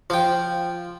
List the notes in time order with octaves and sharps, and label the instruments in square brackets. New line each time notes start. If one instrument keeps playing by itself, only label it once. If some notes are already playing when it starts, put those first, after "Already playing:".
[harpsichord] F3 G5